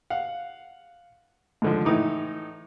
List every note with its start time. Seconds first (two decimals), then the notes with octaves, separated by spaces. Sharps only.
0.10 F5 F#5
1.62 G#2 D3 F3
1.85 A2 E3 D#4 D6